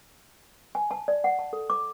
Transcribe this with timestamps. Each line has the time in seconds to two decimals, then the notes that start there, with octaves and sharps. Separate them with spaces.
0.75 G#5
0.91 A5
1.08 D5
1.24 F#5
1.39 A5
1.53 A4
1.70 D6